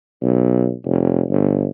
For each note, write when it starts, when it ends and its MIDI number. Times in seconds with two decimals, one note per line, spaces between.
0.22 0.72 35
0.85 1.23 29
1.29 1.68 31